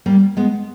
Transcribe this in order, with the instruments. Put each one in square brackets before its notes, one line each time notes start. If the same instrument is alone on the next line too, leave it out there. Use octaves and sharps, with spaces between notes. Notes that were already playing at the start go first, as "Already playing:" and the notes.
[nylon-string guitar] G3 A#3
G#3 B3